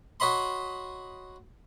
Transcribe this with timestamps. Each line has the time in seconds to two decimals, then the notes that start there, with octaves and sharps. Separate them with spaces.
0.20 F#4 C#5 D#5 B5 C6